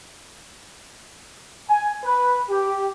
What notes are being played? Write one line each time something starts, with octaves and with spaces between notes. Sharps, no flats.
G#5
B4
G4